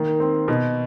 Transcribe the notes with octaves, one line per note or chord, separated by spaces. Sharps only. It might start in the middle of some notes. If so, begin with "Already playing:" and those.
Already playing: D#3 A#3
C4
B2